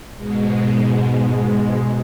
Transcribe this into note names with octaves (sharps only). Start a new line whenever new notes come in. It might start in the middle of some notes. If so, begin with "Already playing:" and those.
G#2 B2 G#3